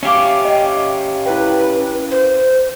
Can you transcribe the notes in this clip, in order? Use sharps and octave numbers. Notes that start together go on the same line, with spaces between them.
C#4 G4 E5 F5 D6
D#5 G5
E4 B4 G5
C5